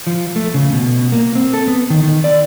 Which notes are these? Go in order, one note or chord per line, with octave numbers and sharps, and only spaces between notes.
F3
A3
C#3
B2
A#3
C4
A4
B3
D#3
D#3
D5